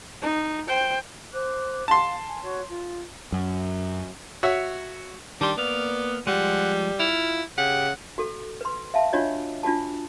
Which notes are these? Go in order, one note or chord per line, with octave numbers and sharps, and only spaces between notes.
D#4
C5 G5
C5 D6 F#6
F5 A5 C6
G#5
F#4 C#5
F4
F#2
F#4 C#5 E5
D#3 G3 D4 C6
A#3 B3 D5 F5
F3 G3 G#3 F#5
E4 F4 F5
C#3 G4 F#5
F#4 A4
B4 C6
E5 F5 A5
D4 F4 F#4 C#5 D#5
D4 F4 F#4 A5